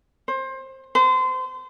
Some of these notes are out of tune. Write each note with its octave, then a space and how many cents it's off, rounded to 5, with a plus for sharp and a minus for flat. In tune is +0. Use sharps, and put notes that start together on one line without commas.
C5 +25
C5 -30